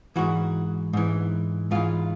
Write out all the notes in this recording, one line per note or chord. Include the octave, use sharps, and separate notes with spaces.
G#2 E3 F#4
G#2 E3
G#2 E3 F4